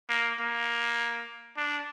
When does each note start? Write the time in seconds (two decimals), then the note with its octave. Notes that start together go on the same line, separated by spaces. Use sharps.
0.09 A#3
0.40 A#3
1.57 D4